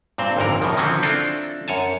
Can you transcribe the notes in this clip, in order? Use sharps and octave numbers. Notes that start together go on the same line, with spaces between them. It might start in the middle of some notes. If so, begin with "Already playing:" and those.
G2 A#2 C4 C5
G#1 F2 A#2 D3 A#4
F#2 B2 F3
D3 D#3 F3 F#3 C4 C#4
C4 D4 E4 F4 A4
F#2 C#5 G#5 A5